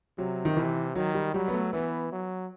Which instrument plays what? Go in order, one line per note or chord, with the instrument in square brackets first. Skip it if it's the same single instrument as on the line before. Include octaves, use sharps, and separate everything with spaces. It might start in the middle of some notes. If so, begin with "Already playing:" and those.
[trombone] C3 [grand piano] F#3
[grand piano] D#3
[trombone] C3 [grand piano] E3
[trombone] D#3 [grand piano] F#3
[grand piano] G3
[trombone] F#3 [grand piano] G3
[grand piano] B3
A3
[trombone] E3 [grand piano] B3
[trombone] F#3